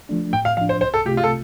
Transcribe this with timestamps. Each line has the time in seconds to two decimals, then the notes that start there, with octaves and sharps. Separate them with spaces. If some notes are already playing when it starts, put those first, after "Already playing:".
0.09 F3 A3 D4
0.33 A2 G5
0.45 F5
0.57 F3 D4 F5
0.69 C5
0.81 C2 C5
0.94 A4
1.05 C3 A3 F4 G4
1.17 F4
1.24 A4